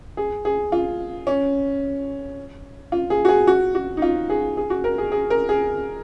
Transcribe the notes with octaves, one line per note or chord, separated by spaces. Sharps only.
G#4
G#4
F4
C#4
F4
G#4
F#4
G#4
F#4
F#4
D#4
F4
G#4
G#4
F#4
A#4
G#4
G#4
A#4
G#4